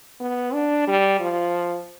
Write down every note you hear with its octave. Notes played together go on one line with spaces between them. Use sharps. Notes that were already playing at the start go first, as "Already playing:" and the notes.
B3
D4
G3
F3